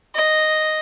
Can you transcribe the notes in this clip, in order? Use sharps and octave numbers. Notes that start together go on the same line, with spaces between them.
D#5